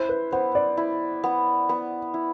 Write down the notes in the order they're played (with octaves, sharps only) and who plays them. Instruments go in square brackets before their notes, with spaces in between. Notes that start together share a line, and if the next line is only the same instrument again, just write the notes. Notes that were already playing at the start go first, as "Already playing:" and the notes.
Already playing: [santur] E4 [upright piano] C5
[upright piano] B4
[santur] B3 [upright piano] C5
[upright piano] D5
[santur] E4
B3
B3
E4